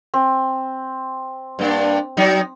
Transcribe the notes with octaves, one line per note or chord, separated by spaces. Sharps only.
C4
G2 A#3 D4
F#3 D#4